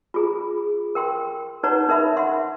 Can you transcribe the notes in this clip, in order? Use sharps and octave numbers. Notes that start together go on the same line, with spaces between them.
F4 G#4 A#5
A#4 G5 C6
D#4 B4 C#5 F#5 A#5
D#4 A#4 E5 B5
E5 F#5 C6